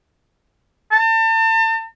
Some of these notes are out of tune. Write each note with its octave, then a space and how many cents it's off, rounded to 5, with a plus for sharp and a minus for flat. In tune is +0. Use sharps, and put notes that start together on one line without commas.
A5 +40